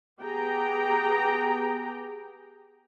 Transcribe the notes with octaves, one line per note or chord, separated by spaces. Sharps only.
B3 G4 G#4 G5 A#5